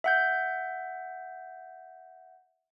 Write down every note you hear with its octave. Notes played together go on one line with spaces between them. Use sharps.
E5 F#5 G6